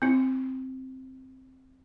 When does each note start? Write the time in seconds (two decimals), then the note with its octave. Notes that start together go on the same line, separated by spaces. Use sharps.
0.02 C4 E4